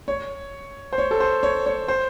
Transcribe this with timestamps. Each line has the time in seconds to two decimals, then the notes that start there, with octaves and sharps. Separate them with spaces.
0.08 C#5
0.93 C5
0.98 C#5
1.11 A4
1.20 C5
1.43 C#5
1.66 C#5
1.88 C5